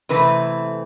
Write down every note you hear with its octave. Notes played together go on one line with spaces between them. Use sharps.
C3 E3 A3 C4 B4